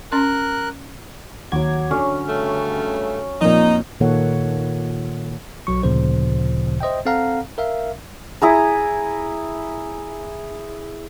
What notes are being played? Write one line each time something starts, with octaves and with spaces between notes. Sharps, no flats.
C#4 A#4 C6 F#6
D#2 F#3 F#4 D6 G#6
D3 C#4 F#4 C#5
G2 C#3 A3
F2 A#2 D#4
A#2 D#3 A#3 A4 C#5 F#5
B1 F#3 C#6
D2 A#2 C#3 F3 C5
C5 D#5 E5 G5
C4 A4 F5 F#5 A#5
A#4 E5 F5
E4 G#4 A#5